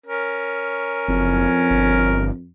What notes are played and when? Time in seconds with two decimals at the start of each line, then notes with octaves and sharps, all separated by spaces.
0.06 C#4 A#4
1.08 F#1 F2
1.70 G1